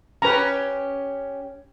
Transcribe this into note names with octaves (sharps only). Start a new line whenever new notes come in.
C#4 G4 B4 A#5